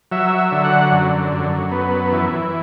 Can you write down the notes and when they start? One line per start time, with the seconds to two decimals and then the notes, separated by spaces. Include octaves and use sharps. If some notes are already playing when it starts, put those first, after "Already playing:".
0.11 F#3 E5
0.38 E5
0.52 D3
0.65 F#5
0.92 F#2
1.32 F#2
1.71 B3
2.12 E3